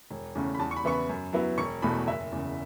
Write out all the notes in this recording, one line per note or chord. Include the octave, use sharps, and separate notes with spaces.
E1
E2 C#3 A3 C#4
B5
E2 A5
C#6
B5
C#3 E3 B3 E4 C#6
B5
F#2
F#3 B3 E4
E1 C#6
E2 B2 A3 B5
F#1 E5
E2 C#3